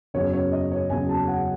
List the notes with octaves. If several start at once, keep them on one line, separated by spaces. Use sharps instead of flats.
F#1 E2 C#3 F#3 C#5
C#5
D#5
C#5
F#1 E2 C#3 F#3 G#5
A5
F#5